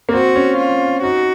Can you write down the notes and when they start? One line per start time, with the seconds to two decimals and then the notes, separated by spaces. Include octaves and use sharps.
0.09 A#3
0.13 C4 F#4
0.36 C#4
0.58 F4
1.03 D#4 F#4